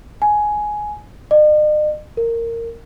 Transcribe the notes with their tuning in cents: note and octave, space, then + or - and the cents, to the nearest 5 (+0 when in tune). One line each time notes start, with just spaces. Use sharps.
G#5 +10
D#5 -45
A#4 -15